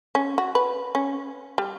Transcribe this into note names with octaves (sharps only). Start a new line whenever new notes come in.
C#4
F#4
B4
C#4
G3